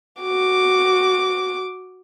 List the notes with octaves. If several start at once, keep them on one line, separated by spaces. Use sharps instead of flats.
F#4 D6